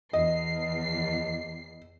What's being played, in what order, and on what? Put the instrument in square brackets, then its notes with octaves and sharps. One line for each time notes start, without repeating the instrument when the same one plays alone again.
[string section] E2 C7 [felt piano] D#5